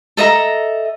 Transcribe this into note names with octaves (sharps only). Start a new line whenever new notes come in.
A4 D#5 E5 A#5